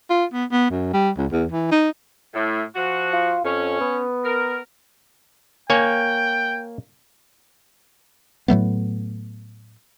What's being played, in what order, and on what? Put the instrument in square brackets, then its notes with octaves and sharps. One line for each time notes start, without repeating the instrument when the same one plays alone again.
[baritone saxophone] F4
B3
B3
F#2
G3
C#2
E2
E3
D#4
[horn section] A2
F3 F#4
[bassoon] F4
[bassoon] F2 [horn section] C#4
[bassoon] B3
[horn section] A#4
[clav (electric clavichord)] A#3 C#5 G#5 [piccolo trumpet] G5
[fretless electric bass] A2 F#3 A3 B3